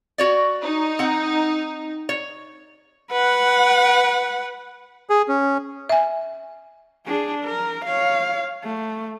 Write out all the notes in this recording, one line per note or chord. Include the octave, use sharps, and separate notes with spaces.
F#4 C#5 D5
D#4
C4 F#5
C#5
B4 F#5
G#4
C#4
E5 G#5
D4 G#4
A#4
C#5 F5
A3